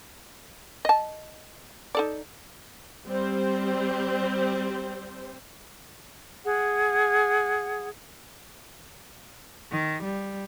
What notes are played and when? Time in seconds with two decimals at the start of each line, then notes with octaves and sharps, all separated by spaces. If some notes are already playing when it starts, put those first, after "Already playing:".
0.85 D#5 A5
1.95 D#4 A4 D5
3.07 G3 C4 C5
6.46 G#4 F#5
9.72 D#3
10.04 G3